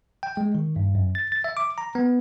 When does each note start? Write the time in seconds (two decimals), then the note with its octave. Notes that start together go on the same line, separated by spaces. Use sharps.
0.23 G5
0.37 G#3
0.55 D#3
0.76 G2
0.95 F#2
1.15 A6
1.32 A6
1.44 E5
1.57 D6
1.78 A#5
1.95 B3